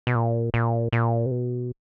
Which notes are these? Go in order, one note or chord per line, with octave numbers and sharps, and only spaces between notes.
B2
A#2
A#2
A#2
C3
B2